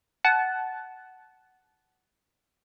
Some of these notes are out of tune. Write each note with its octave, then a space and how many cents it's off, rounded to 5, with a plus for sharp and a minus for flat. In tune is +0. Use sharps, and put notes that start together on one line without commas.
F#5 +10 A5 -20